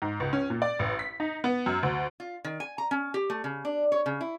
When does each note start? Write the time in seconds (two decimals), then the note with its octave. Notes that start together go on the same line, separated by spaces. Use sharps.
0.02 G#2
0.20 C#2
0.33 C#4
0.50 A#2
0.62 D5
0.79 A1
0.99 B6
1.20 D#4
1.44 B3
1.66 F#2
1.83 D2
2.20 F4
2.44 D#3
2.60 G#5
2.78 A#5
2.91 C#4
3.14 G4
3.30 A3
3.44 C#3
3.65 D4
3.92 C#5
4.06 C#3
4.21 E4